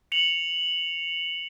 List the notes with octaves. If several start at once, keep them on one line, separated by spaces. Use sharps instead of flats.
C#7 F7 F#7